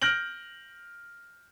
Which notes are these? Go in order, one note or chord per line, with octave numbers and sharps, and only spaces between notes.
F6 G6 A#6 D7 F#7